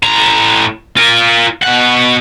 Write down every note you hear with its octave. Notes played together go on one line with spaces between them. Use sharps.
A2 A#5
F4 A#4
B2 F#5